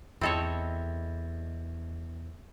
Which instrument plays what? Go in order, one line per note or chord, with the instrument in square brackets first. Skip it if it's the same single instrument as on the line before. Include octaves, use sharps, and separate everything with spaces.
[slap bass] E2 [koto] C4 A4 C#5 [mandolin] D#5 E5 B5